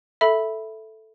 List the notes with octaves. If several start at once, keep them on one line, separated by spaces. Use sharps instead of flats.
A4 E5 B5